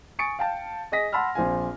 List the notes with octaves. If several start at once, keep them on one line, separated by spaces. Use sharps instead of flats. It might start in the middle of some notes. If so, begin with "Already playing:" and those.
G#5 C#6 D#6 A6 C#7 D7
F5 G5 A5
G#4 D#5 D#6 A#6 B6
F#5 A5 B5 C6 E6 F6
A#1 C4 F4 G#5